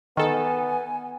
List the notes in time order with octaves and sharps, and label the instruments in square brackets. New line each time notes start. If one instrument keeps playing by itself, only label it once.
[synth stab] D#3 A4 [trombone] B3 [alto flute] G#5